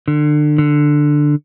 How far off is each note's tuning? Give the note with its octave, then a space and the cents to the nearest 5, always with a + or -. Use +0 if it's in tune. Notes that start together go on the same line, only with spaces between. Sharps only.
D3 +30
D3 +10